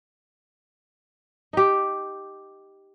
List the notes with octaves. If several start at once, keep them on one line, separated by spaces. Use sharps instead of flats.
D#4 G4